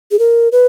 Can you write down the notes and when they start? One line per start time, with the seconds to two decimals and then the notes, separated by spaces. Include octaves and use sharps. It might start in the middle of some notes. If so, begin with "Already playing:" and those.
0.11 G#4
0.19 A#4
0.52 B4